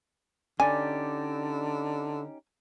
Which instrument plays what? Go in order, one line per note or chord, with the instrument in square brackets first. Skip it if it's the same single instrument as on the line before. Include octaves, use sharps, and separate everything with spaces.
[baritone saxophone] D3 [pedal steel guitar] C#4 D#4 G4 [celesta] D5 D6 A6 [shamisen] G#5